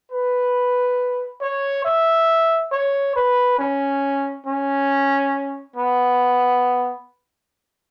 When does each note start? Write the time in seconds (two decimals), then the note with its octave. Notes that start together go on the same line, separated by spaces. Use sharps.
0.12 B4
1.42 C#5
1.85 E5
2.72 C#5
3.16 B4
3.59 C#4
4.46 C#4
5.76 B3